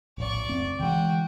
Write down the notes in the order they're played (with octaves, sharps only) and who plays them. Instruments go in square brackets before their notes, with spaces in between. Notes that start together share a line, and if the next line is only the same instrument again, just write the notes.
[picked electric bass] D1 A#1 [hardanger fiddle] D5 C#6
[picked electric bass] F#1 A3 C4
[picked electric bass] D3 E3 G#3 [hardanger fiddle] F#4 G5